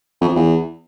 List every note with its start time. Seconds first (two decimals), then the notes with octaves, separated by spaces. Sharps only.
0.21 F2
0.28 F3
0.36 E2